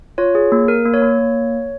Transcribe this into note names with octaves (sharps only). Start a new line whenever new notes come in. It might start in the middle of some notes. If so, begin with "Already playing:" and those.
F4 C#5
G#4
A#3
A#3 A#4
A#3
C#5
A#3
A#3